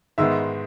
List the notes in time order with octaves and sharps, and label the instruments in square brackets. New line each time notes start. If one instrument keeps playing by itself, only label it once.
[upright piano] G#2 D#3 G#3 B3 E5 E6